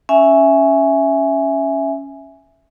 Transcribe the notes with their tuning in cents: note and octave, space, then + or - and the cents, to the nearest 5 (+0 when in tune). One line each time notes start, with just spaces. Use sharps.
C#4 +0 E5 +0 G#5 +0